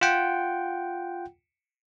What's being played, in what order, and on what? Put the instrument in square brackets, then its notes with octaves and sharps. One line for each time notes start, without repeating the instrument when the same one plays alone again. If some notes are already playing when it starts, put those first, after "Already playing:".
[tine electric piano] F4 F#5 G5